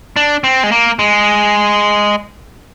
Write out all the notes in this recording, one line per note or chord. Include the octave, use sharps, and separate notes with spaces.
D4
C4
G#3
A#3
G#3